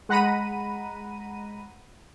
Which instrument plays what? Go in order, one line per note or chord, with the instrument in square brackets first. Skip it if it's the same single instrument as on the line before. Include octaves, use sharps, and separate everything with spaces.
[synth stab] G#3 F#5 A#5 B5 D#7